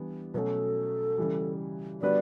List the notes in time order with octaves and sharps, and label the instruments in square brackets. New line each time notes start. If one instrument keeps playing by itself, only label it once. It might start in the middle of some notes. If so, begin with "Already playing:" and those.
Already playing: [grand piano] E3 G3 B3 D4
[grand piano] B2 F#3 A3 C#4 [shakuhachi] A4 B4
[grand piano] C#3 E3 G3
[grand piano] D3 G3 B3 F#4 B4 [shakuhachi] D5